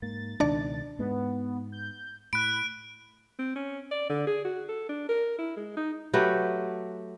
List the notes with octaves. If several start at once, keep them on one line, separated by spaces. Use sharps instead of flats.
G#2 A#3 A6
C#2 B2 D#3 D4 D5
G#2 G#3 B3
G6
A2 B5 F#6 D7
C4
C#4
D5
D3
G#4
F#4
A4
D4
A#4
E4
G#3
D#4
F#3 A3 G4 B4